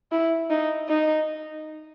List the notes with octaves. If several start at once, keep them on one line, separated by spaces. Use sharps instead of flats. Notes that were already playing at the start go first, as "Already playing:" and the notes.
E4
D#4
D#4